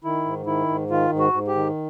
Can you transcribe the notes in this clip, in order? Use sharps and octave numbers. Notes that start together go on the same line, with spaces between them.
D#3 E4
G#2
D#3 E4
G#2
D#3 F4
G#2
F#4
G#2
G4
D#3